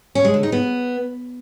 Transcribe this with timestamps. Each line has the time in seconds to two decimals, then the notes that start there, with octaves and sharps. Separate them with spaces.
0.15 C#4
0.25 G#3
0.34 D3
0.43 D#4
0.52 B3